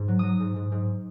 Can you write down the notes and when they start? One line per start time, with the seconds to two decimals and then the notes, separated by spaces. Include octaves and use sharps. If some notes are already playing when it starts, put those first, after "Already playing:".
Already playing: G#2
0.08 F#3
0.19 F#3 D#6
0.40 G#2
0.56 G#2
0.72 G#2